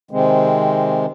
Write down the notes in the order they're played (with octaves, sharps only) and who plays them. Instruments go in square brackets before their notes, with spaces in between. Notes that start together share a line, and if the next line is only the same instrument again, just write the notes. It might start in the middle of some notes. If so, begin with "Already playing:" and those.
[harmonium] C3 D#3 G#3 C4